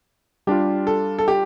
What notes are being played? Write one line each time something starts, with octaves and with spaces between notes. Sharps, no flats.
G3 D4 F4 G4
A4
A4
G4